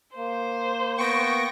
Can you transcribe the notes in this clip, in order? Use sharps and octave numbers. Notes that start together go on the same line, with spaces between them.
A#3 C5
B3 G5 C#6 A#6